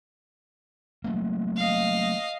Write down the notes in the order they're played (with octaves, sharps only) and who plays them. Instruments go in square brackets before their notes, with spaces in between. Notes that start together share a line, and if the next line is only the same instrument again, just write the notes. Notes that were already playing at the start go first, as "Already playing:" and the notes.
[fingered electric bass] F#3 A3 A#3
[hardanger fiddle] D#5 F5